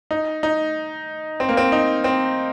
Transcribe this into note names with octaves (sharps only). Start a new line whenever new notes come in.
D#4
D#4
C4
A#3
C4
D#4
C4